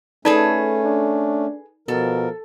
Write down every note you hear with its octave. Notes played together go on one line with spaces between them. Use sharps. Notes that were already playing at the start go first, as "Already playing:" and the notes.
A3 C#4 D#4 G#4 A4 B4 D5
D4
B2 F3 A4 A#4